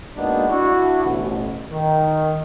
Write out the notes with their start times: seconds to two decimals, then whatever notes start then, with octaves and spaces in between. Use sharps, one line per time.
0.16 G#3 A#3 B3 D4 D#4 F#4
0.48 D4 E4 F#4
1.04 A1 D2 B2
1.71 D#3